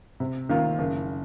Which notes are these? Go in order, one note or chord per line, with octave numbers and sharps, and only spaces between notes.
C3
D#3 A#3 F4
F#1